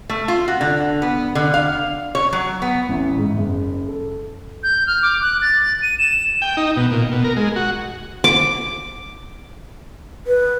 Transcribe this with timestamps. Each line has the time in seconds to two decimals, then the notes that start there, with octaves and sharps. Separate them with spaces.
0.10 A3
0.28 F4
0.48 F#4
0.61 D3
1.02 B3
1.35 D3
1.54 F5
2.15 C#5
2.33 F#3
2.62 B3
2.89 A1
3.17 G#2
3.38 F#1
3.88 A4
4.63 G6
4.87 F6
5.03 D6
5.22 F#6
5.42 A6
5.82 D#7
5.98 E7
6.42 G5
6.57 D#4
6.77 B2
6.91 A#2
7.12 B2
7.24 A#4
7.37 G#3
7.56 F#4
8.24 D6
10.27 B4